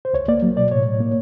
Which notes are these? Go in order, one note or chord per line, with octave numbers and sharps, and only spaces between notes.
C5
C#2 C#5
A#3 D5
F#3
B2 D5
A2 C#5
A2
A#3